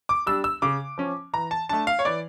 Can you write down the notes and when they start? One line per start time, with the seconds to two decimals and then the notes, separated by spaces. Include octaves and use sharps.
0.09 D6
0.26 G3 D4 E6
0.44 E6
0.62 C#3 D6
0.98 F3 C#4
1.33 E3 A#5
1.51 A5
1.69 A3 D4 A5
1.87 F5
1.99 C#5
2.05 E3 D5